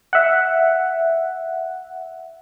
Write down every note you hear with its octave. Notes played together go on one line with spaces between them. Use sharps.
E5 F#5